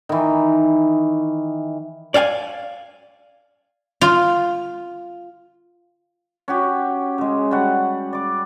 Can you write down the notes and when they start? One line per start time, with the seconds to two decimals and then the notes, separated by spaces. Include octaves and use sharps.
0.09 D#3 E3
2.14 D5 F5 G5 G#5
4.01 F4
6.48 C#4 F#4 G4
7.18 C#3 G#3
7.51 G3 F#4 F#5
8.13 D5 D6